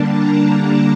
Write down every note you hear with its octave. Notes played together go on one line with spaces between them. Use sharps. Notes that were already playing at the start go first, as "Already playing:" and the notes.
Already playing: D3 G3 A#3 D4 A5
A#5